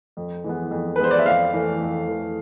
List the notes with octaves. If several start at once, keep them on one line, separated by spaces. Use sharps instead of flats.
F2
E3 G#3 B3
F2
B4
E3 G#3 B3 C5
D5
E5
F2 F5
E3 A3
F2
E3 A3